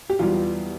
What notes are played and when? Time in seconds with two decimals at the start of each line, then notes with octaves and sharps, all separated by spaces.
0.10 G4
0.19 E2 B2 G3 F4